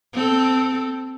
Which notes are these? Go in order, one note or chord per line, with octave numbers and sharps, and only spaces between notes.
C4 A4